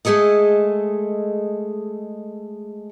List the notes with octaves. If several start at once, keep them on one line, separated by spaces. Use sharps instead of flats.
G#3 A3 G#4 A4 D#5